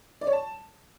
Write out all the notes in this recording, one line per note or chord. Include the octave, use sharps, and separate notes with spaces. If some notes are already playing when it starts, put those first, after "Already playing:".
D5
C#5
A5